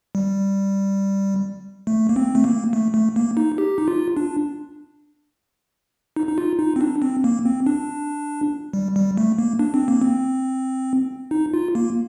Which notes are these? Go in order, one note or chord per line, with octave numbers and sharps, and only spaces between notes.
G3
A3
A#3
C4
A3
A#3
A3
A3
A#3
D#4
G4
D#4
F4
D4
D#4
D#4
F4
D#4
C4
D4
C4
A#3
C4
D4
G3
G3
A3
A#3
D4
C4
A#3
C4
D#4
F4
A#3